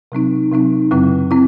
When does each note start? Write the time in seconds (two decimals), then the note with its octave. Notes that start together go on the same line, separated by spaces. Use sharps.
0.12 C3 F#3 C4 D#4
0.51 C3 F#3 C4 D#4
0.91 F#2 C#3 F#3 C4 E4
1.31 C4 E4